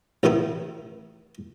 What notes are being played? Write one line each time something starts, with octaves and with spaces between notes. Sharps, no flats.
A1 B2 D#3 D#4 E4